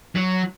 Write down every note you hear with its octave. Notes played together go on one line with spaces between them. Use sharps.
F#3